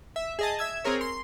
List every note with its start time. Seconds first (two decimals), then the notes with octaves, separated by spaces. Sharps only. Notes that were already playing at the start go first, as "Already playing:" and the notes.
0.16 E5
0.39 G#4 D#5 A5
0.59 E5 E6 G#6
0.84 C4 G#4 A#4 C#5
1.01 C6